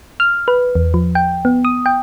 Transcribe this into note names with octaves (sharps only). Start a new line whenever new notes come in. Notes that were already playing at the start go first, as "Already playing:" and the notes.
F6
B4
E2
F3
G5
B3
D#6
G5